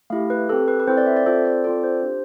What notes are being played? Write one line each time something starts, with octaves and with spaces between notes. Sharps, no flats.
A3 E4 G4 F5
B4
C4 G4 A4
B4
B4
C4 E4 A4 C5
D5
E5
D5
C4 F4 A4 C5
D5
C4 F4 A4 D5
C5
D4 G4